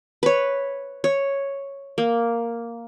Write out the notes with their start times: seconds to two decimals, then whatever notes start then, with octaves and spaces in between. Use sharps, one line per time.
0.23 B4 C#5
1.04 C#5
1.98 A#3